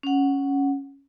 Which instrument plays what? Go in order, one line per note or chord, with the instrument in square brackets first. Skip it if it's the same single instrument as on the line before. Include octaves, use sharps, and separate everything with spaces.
[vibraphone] C#4 F#5